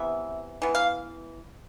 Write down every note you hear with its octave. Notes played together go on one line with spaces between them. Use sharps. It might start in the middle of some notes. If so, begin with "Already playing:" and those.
Already playing: C3 E3 B3 E5
E3 B3
F5